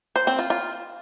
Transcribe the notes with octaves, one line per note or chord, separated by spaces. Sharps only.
C5
C4
F4
F4